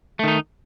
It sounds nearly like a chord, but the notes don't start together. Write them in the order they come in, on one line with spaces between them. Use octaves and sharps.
A3 D#3 D#4